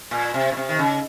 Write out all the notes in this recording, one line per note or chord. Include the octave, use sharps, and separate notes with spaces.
A#2
C3
A#2
C3
D#3
C#3